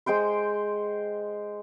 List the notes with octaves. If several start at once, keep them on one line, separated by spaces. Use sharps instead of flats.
G#3 C5 G5 C6